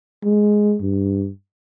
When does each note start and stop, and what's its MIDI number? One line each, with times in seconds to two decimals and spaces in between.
0.24 0.76 56
0.82 1.29 43